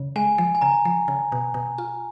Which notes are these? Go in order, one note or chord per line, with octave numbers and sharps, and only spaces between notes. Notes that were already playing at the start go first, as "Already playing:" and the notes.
Already playing: C#3
G#3 G#5
F3 G#5
G#5
C#3 A#5
F3
C#3
B2
B2
F4